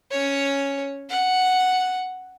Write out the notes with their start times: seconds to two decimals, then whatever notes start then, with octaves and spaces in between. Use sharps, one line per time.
0.12 C#4 C#5
1.10 F#5